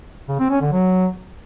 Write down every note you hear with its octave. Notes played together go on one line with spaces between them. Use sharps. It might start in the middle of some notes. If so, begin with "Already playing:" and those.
C#3
C4
C#4
D3
F#3